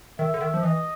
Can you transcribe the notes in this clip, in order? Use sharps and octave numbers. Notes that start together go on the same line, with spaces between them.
D#3 E5
D3
D#3
F3
E3 D#5